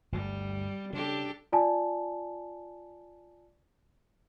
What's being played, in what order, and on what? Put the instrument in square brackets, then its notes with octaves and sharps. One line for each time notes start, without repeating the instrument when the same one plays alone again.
[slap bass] G1 D2 A3 [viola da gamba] G3
[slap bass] C#3 [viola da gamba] D4 G4 A4
[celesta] F4 D5 G#5 A5